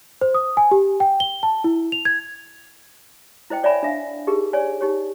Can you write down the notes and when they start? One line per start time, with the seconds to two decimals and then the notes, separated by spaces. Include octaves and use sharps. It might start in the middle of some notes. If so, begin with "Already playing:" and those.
0.21 C5
0.34 D#6
0.57 G#5
0.71 G4
1.00 G5
1.20 G7
1.43 A5
1.64 E4
1.92 F7
2.05 G#6
3.50 E4 C5 D#5 G5
3.63 C#5 D5 E5 G#5 A#5 B5
3.83 D4 E5 F5
4.27 D#4 G4 G#4 A#4
4.53 C#5 D5 G#5
4.81 D#4 G4 C#5